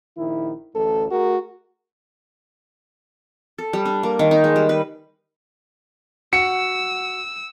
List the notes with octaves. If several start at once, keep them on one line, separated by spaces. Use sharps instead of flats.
A#1 D#3 E4
A1 D2 A4
A3 F#4 G#4 A#4
A4
G3
D4
A#3
D#3
D#4
G#3
G3
B4
F#4 E6 C#7